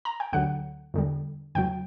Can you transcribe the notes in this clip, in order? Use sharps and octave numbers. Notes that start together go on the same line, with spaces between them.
A#5
G5
D2 D3 F#3 F#5
E2 D3 G3
E2 C#3 F#3 G5